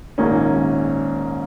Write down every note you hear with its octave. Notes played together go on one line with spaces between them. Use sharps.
A#1 G#2 D#3 A#3 C#4